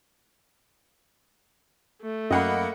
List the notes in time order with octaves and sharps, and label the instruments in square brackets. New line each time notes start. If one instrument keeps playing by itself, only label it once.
[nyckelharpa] A3
[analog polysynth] F#2 [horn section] A#3 [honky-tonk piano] D#5 F#5 B5